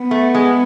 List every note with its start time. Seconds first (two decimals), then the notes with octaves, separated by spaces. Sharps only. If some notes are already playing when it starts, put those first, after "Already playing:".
Already playing: B3
0.11 A3
0.35 G#3